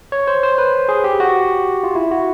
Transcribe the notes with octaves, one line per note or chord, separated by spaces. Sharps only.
C#5
C5
C5
B4
G#4
G4
F#4
F4
E4
F#4